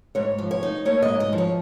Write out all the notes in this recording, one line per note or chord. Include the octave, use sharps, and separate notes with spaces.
G#2 C#5
F3
C#5
D#4
A#3 C#5
D#5
G#2
D#5
F3
C#5